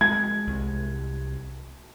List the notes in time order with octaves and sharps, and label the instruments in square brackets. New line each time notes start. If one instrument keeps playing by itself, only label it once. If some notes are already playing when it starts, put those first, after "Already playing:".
[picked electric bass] G#3 [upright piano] G#6
[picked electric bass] C2